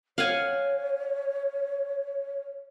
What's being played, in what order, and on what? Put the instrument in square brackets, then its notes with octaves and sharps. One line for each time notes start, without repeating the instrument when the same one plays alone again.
[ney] C#5 [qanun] F5 F#5 G#5